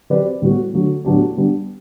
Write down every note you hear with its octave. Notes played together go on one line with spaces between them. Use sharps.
F#3 C4 G4 B4 D5
A2 G3 B3 F#4
D3 F#3 A3
A2 F#3 B3 D4 G4
G3 B3 D4